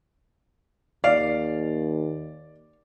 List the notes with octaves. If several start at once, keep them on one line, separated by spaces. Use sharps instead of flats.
D#2 D5 F5